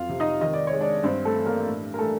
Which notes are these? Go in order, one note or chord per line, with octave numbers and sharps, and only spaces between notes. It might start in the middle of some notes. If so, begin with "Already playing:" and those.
Already playing: F2 F#3 F4 F5
C3
D#4 D#5
D#3 D#5
D5
C#5
G#3
D4 D5
G2 C4 C5
A3 A4
E3
A#3 A#4
A2
A#4
E3 A3 A4